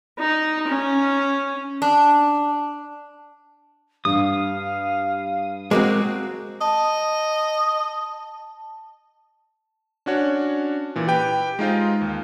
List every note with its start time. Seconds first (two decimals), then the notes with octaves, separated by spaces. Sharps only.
0.19 D#4
0.68 C#4
1.82 D4
4.05 G2 F5 D#6
5.71 G#3 A#3 C4 F#4 D6
6.61 D#5 A5
10.06 C#4 D4 F#4 C#5
10.96 A#2 E3
11.07 G4 B4 G5
11.59 G#3 D#4 F4 C5
12.02 D#2